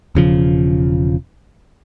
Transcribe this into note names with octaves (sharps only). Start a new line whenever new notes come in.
E1 C#3 F3